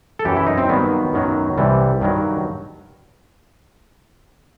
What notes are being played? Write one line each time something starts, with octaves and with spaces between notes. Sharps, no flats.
A4
F#2 E3 G4
E4
D#4
C4
G2 D#3 F#3 B3
F#2 D#3 F#3
C2 C3 E3 G3
G2 D#3 F#3